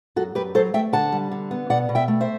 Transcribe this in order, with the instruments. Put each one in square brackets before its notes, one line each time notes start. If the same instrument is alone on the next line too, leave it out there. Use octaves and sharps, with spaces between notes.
[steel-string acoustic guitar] F#2 F#4 A4
F#2 G4 B4
F#3 A4 C5
A3 E5 G5
D3 F#5 A5
G3
D3
B3
B2 D5 F#5
B2
E5 G5
A3
C5 E5